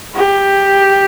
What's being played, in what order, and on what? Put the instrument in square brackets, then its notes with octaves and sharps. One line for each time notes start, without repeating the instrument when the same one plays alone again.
[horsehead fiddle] G4